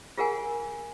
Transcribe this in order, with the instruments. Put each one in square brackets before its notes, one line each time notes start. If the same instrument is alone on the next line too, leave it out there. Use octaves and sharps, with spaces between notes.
[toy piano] F4 G#4 A#4 F#5 G#5